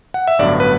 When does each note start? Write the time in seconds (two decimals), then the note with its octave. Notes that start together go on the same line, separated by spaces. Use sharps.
0.14 F#5
0.28 E5
0.39 A1 G2 D3 F#3 B3 D5
0.60 B4